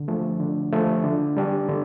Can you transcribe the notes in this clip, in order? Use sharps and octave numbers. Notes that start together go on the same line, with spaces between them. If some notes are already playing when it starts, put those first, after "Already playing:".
Already playing: D3
F3 A3
D3
F3 A3
D3
G3 D4 G4
D3